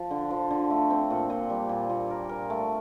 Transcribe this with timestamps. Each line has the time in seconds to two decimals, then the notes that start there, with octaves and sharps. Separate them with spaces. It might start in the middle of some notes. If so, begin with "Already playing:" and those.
Already playing: F3
0.11 D3
0.30 F3
0.50 D3
0.70 A3
0.90 C4
1.10 A#2
1.30 A#2
1.50 G3
1.69 A#2
1.90 A#2
2.10 A#4
2.29 A#4
2.50 A3